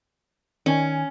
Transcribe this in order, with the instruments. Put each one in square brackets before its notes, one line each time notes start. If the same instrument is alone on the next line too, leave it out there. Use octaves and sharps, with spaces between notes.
[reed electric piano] D#3 G#5 [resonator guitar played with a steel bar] C#4